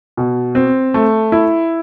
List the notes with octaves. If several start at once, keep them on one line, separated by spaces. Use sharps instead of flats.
B2
C4
A3
E4